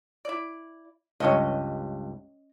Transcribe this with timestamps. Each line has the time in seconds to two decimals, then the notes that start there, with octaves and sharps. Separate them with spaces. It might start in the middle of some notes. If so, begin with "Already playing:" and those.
0.25 E4 D5
1.20 C#2 G2 C#4 C#5 D#5